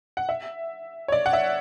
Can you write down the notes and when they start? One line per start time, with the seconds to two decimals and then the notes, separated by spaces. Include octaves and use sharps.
0.17 F#5
0.29 E5
1.08 C#5
1.12 D5
1.26 F#5
1.33 E5